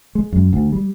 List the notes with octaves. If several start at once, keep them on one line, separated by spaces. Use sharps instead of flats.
G#3
F#2
D2
G3